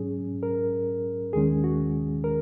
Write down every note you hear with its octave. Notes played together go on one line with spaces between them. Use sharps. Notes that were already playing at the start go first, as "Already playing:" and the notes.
Already playing: G#2 F#3 C#4 G#4
A#4
D#2 D#3 G#3 C#4 G#4
F#4
A#4